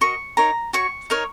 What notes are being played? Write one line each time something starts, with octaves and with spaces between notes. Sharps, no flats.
F#4 A#4 D#5 C#6
D#4 A#4 C#5 A#5
F#4 C#5 C#6
D#4 A#4 C#5